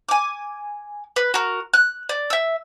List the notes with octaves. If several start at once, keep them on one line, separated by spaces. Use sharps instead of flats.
G#5 D6
B4
F#4 A#4
F#6
D5
E5 E6